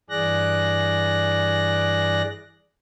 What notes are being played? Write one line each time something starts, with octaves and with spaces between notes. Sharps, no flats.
G2 E3 G#4 D5 F#6 A#6